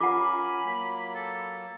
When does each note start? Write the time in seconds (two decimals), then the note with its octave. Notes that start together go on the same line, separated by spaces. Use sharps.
0.01 C#4 F4 A#4 F#5 G#5 B5 D6
0.65 F#3 A#3
1.14 A4